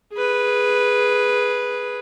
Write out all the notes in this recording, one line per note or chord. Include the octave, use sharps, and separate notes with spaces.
G#4 B4